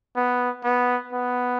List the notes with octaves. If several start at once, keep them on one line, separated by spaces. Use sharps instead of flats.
B3
B3
B3